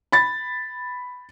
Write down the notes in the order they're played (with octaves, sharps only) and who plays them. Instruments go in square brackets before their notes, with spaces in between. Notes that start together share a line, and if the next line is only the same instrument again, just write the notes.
[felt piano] B5 A6